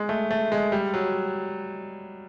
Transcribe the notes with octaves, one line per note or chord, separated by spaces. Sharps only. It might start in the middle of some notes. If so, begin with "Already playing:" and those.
Already playing: G#3
A3
A3
G#3
G3
F#3